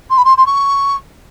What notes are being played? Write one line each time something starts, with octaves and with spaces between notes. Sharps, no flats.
C6
B5
C6
C6
C#6